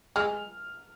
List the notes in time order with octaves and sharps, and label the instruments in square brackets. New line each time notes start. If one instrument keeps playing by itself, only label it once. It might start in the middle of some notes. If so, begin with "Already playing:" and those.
[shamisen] G#3 [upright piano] F6